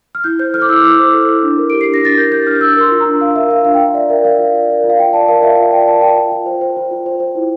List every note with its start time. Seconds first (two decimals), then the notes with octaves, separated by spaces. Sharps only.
0.15 F6
0.24 E4 G6
0.39 C5 G6
0.54 A4 F6
0.62 D6
0.69 E4 E6
0.83 E4 D6
0.99 C5
1.13 A4
1.28 E4
1.43 D4
1.58 A#4
1.70 G4 D7
1.81 C7
1.88 D4
1.94 A#6
2.02 D4 A6
2.17 A#4 G6
2.32 G4 G6
2.47 D4 F6
2.61 D4 E6
2.76 A#4 C6
2.91 F4
3.00 A#5
3.06 D4
3.20 D4 F5
3.36 A#4 E5
3.50 F4 F5
3.65 D4 F5
3.74 G5
3.80 F4 F5
3.94 D5 E5
4.10 A#4 E5
4.24 F4 F5
4.39 F4
4.54 D5
4.69 A#4
4.84 F4
4.90 F5
4.99 F4 G5
5.13 D5 A5
5.28 A#4 F5
5.43 F4 E5
5.57 F4 F5
5.72 D5 G5
5.87 A#4 A5
6.02 F4 G5
6.17 F4
6.32 F4
6.46 C5
6.61 C5
6.77 F4
6.91 F4
7.06 C5
7.20 C5
7.35 E4